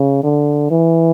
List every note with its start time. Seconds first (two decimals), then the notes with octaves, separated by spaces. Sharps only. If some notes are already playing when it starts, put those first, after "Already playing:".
Already playing: C#3
0.23 D3
0.71 E3